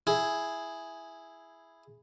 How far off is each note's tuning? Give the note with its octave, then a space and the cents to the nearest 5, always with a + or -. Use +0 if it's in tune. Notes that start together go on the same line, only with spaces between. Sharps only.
E4 +0 G#4 +0